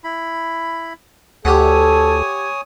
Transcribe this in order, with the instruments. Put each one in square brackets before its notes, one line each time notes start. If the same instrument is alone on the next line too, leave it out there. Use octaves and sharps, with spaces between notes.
[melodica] E4 B5
[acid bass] D2 [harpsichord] G4 F#5 [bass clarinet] A4 [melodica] C#5 G#5 D#6